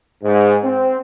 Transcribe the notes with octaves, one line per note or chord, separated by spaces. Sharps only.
G#2
C4